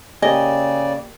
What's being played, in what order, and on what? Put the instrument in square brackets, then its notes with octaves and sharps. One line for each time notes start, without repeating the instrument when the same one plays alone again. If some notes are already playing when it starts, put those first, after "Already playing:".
[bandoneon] C#3 D5 [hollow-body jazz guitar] A#3 G4 [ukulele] D#5 [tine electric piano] G#5